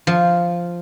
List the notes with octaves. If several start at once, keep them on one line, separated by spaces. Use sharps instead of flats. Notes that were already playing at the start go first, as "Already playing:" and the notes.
F3